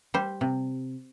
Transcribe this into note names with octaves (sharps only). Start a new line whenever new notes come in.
G3 C5
C3